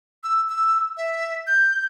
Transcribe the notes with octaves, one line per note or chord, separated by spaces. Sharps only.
E6
E6
E5
G6